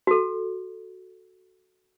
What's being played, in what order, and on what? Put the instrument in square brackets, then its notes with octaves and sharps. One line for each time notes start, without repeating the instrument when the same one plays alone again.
[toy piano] F#4 A4